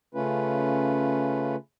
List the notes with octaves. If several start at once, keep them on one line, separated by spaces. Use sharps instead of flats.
C#3 A3 C#4 F4 B4